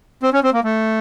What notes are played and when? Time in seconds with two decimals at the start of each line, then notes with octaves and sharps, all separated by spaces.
0.23 C4
0.33 C#4
0.43 C4
0.53 A#3
0.64 A3